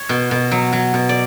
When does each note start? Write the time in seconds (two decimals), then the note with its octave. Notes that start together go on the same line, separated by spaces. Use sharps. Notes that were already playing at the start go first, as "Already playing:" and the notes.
Already playing: C#5
0.09 B2
0.31 B2
0.51 F#3
0.73 F#3
0.94 B2
1.09 D5